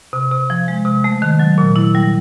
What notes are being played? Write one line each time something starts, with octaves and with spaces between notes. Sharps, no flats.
C3
C3
F3
G#3
C3
A3
D#3
F#3
A#2
E4
G3